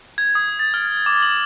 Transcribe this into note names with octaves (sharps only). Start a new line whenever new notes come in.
G#6
D#6
A6
F6
D6
F#7